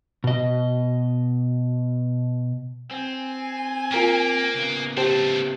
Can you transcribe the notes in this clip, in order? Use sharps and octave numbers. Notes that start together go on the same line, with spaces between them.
B2 D#5
C4 G#5
A#3 F4 A#4 B6
C#3 B3
A3 C4 G4 C5 A5